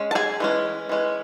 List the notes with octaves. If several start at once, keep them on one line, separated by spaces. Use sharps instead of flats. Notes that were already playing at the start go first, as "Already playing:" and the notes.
Already playing: G#3 C#4
A5
G#4 G#5
E3 G#3 C#4
E3 G#3 C#4